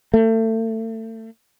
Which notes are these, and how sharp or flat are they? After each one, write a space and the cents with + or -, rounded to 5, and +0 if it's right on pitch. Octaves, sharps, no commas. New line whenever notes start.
A3 +30